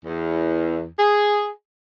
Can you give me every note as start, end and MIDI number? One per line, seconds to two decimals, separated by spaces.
0.05 0.86 40
0.99 1.51 68